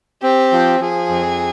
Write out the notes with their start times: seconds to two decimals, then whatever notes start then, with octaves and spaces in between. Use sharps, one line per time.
0.23 C4 G4
0.52 F3
0.80 F3 G#4
1.09 F2